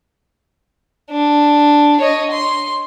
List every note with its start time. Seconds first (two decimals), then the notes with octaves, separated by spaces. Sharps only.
1.11 D4
2.00 C#5 D#5
2.31 C6